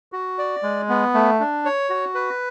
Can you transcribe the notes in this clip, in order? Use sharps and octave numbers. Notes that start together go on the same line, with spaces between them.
F#4
D5
G#3
B3
A3
D4
C#5
F#4
B4